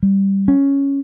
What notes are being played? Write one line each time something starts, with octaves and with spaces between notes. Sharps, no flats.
G3
C#4